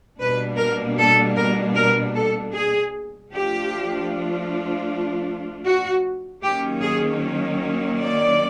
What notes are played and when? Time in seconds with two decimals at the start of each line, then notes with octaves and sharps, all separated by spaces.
0.20 B2 G3 A#3 D4 B4
0.58 A#4
0.99 A4
1.36 A#4
1.75 A#4
2.15 A4
2.54 G#4
3.31 F3 A3 D4 F4 G4
5.66 F#4
6.43 D#3 F#3 A#3 C#4 G4
6.82 G#4
8.00 D5